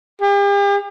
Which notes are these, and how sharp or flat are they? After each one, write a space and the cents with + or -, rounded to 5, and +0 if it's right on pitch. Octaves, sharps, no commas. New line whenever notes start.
G4 +40